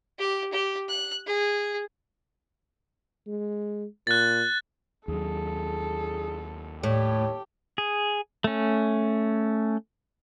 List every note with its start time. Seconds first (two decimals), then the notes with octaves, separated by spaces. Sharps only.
0.19 G4
0.53 G4
0.89 F#6
1.27 G#4
3.27 G#3
4.07 A#2 F#6 A6
5.08 D#2 F#3 G#4 A4
6.83 A2 G4 C#5
7.78 G#4
8.44 A3 C#4